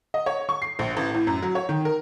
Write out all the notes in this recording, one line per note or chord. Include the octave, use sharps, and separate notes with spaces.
D#5
C#5
C#6
C7
A#1
A1
A2
F#2
F#3
C#5
D#3
A#4